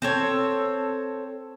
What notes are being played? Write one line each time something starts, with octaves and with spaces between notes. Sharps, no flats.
C4 A4 C#5